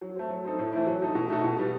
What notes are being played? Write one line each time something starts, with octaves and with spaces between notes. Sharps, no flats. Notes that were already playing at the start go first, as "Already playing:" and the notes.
F#3
A3 C4
F#3
C4 D#4 A4
A2
E3 A3 C4 E4
F#3
A3 D#4 A4
B2
A3 D#4 F#4 A4
B2
G3 B3